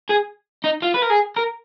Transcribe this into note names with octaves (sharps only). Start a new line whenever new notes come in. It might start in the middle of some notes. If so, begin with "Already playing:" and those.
G#4
D#4
F4
B4
A#4
G#4
A#4